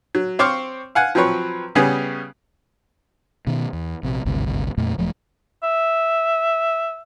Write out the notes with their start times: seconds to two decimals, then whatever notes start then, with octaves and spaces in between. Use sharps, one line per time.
0.15 F#3
0.39 C4 C5 C#5 C#6 D6 F6
0.95 F5 F#5 G#5
1.15 F3 F#3 C4 B4 C#5
1.75 C#3 G3 B3 C#4 G#4
3.47 B2 D#3
3.73 E2
4.03 A#1 C3
4.25 G#1 D2 G2 C3
4.77 F2 A#2 A3
4.98 E1 F3 F#3 A3
5.63 E5